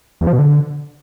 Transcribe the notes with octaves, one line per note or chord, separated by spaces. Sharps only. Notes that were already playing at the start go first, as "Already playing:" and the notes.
E2
F3
B2
D3